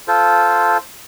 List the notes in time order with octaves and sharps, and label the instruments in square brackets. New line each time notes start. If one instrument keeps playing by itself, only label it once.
[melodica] F4 A4 C5